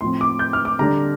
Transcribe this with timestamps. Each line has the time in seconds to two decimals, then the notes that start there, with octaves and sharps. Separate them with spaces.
0.01 A2 F3 C4 C6
0.21 D6
0.39 G6
0.53 F6
0.65 D6
0.79 D3 G3 D4 A#5